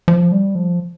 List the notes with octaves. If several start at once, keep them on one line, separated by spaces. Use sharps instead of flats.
F3
G3
F3